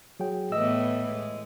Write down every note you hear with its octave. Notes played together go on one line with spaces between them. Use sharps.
F#3 G#4 G5
A2 E3 B3 D#5 E6
G#3